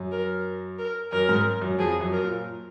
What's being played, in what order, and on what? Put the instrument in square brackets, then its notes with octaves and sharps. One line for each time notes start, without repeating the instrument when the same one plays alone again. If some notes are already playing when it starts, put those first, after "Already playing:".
Already playing: [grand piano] F#2
[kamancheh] A#4
A#4
[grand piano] F#2 [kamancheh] A#4
[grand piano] G#2
F#2
[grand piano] F2 [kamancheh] G#4
[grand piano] F#2
[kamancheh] A#4
[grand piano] A#2